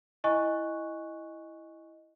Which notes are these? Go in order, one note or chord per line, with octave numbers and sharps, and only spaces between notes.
E4 D#5 G#5 C#6 F#6